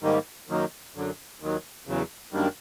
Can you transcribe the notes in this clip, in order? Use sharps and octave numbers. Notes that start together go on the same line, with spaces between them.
G#2 D#3 G3 A#3 D#4
F#2 D#3 F#3 A#3 D#4
F#2 D3 F#3
D#2 D#3 F#3
E2 C#3 F#3
F#2 D#3 G3 A#3 D4